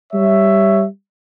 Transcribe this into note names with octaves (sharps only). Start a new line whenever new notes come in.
G3 C#5 E5